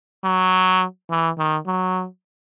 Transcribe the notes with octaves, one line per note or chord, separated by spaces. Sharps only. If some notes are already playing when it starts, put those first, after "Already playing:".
F#3
E3
D#3
F#3